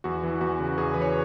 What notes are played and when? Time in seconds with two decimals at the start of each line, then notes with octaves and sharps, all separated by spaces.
0.04 E2 F#4
0.23 E3
0.41 E2 F#4
0.59 C#3
0.78 E2 G#4
0.94 E3 B4
1.02 C#5